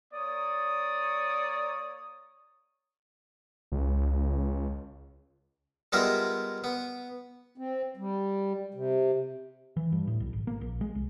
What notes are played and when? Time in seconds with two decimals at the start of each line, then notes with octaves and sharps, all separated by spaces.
0.14 A#3 C#5 D5 D#6
3.72 C#2
5.92 G3 G#3 B3 F4 A#4 E5
6.64 B3
7.58 C4
7.97 G3
8.74 C3
9.77 E3
9.92 G2
10.07 A2
10.20 B1
10.33 G#1
10.47 A#3
10.61 A#1
10.81 G#3
10.95 C2